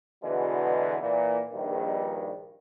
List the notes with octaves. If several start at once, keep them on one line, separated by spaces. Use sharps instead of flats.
E2 B2 D3 E3 F#3 G#3
A#2 E3
A#1 G2 D#3